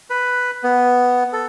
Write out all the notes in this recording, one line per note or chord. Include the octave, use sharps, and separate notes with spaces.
B4
B3
A4